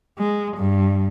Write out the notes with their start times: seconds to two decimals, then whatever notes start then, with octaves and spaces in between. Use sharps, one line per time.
0.18 G#3
0.57 G2